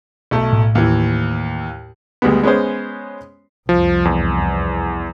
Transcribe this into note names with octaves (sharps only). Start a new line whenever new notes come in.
B1 A3
A2
D#2 E3
D2 G3 G#3 B3
G#3 B3 C#4 B4 C5
C2 F2 F3
E2